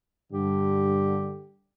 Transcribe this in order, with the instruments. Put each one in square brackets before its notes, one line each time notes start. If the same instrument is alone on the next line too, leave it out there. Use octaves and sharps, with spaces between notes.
[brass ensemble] G2 D3 [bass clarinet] G4